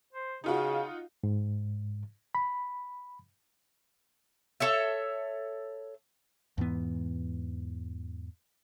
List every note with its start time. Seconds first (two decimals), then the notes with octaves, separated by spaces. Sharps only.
0.13 C5
0.44 C#3 D#4 F4 F#4
1.24 G#2
2.35 B5
4.60 A4 C#5 E5
6.58 E2 G#2 E3 B3